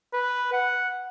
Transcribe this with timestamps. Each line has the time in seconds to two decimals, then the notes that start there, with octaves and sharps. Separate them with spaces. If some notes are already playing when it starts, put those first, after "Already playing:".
0.13 B4
0.53 F#5